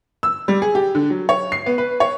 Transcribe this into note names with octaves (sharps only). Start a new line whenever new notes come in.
E6
G3
G#4
G4
D3
F#3
C#5
C7
B3
B4
C#5